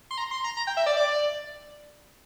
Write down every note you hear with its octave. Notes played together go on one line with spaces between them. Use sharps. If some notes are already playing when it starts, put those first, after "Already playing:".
C6
A#5
C6
A#5
A#5
G5
E5
D5
D5